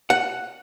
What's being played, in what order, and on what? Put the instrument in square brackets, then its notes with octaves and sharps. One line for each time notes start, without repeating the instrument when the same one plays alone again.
[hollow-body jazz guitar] F#5